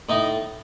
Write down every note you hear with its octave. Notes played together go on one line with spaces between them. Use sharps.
A2 D#4